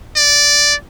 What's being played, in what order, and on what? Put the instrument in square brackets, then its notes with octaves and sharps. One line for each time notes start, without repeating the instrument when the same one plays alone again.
[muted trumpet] D5